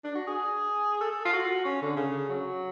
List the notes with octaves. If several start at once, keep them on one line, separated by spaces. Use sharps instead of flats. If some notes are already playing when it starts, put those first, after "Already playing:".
D4
F#4
G#4
A4
F4
F#4
C#4
D3
C#3
F#3